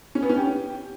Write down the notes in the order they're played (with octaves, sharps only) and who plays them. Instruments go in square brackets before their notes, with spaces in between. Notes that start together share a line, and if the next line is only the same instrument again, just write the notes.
[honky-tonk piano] C#4
B3
C#4
G4